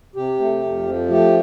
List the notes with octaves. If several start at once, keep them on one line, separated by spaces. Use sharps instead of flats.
C3 G4
A3
F2
F3
A3 G4